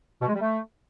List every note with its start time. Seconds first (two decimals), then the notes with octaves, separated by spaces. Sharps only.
0.21 B2
0.28 G#3
0.35 G3
0.41 A3